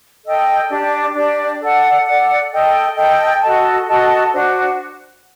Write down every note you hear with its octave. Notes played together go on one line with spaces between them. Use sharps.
A4 D#5 G5
D4 G4 D5
D4 G4 D5
A4 D5 F#5
A4 D5 F#5
A4 D#5 G5
A4 D#5 G5
F#4 A4 D#5 A5
F#4 A4 D#5 A5
D4 F#4 C5